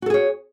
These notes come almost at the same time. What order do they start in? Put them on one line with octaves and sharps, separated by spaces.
F#4 A4 G#4 C#5